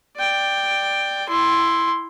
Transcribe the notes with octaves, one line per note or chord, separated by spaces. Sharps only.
D5 G5
E4 C6